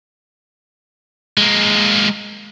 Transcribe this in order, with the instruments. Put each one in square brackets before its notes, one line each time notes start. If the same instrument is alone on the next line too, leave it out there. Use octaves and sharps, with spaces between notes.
[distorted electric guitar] G#3 A#3